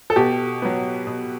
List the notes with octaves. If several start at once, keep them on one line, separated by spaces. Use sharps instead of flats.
A4
B2 G4
F#3 B3
B2